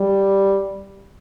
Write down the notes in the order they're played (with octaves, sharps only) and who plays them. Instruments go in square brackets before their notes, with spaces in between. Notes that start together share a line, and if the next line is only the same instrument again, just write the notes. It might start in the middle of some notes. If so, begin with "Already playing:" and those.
Already playing: [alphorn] G3